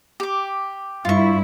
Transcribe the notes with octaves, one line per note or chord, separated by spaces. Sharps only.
G4 D6
G2 E4 F4 C#6